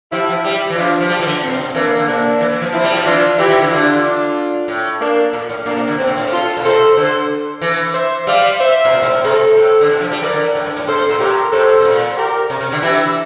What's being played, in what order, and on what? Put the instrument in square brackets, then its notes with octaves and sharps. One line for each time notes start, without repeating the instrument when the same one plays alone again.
[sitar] F3 [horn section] E4 G4
[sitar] F3
[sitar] G3 [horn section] E4 G4
[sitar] E3
[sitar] F3 [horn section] D4 F4
[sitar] F3
G3
E3
D3
[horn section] C4
[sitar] A#2
C3
C3
[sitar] E3 [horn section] A#3 D4
[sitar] D3
[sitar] C3 [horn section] A#3 D4
[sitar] E3
E3
F3
[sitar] F3 [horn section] C4 E4
[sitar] G3
F3
[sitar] E3 [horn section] D4 F4
[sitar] E3 [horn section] E4 G4
[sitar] E3
D3
[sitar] D3 [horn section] D4 F4
[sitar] A2
[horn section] A#3 D4
[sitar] A#2
A2
[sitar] A#2 [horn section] A#3 D4
[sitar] C3
D3
[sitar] A2 [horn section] C4
[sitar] A#2
A2
[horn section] F4 A4
[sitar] A#2
[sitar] C3 [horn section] A4 C5
[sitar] D3 [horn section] A4 C5
[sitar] E3
[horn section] C5 E5
[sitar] G3 [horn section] D5 F5
[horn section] C5 E5
[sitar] A#2
C3
A2
A2
[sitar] C3 [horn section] A4 C5
[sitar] A2
D3
C3
F3
G3
[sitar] E3 [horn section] A#4 D5
[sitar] D3
A2
G2
A2
[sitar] C3 [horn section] A4 C5
[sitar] C3
A#2
[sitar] A2 [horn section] G4 A#4
[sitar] A2 [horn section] A4 C5
[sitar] C3
A#2
[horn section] G4 A#4
[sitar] C3
C3
D3
[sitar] E3 [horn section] E4 G4